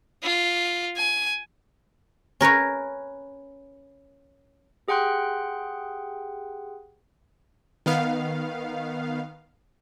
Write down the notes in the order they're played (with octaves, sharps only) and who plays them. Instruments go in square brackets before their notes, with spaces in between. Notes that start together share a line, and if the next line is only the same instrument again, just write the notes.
[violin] F4
G#5
[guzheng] C#4 A#4 B4 C#5
[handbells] G4 G#4 F#5 G5 C6 F#6
[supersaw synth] D#3 B3 F5